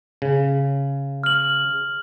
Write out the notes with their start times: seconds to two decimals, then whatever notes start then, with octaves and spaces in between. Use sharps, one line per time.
0.22 C#3
1.24 F6 F#7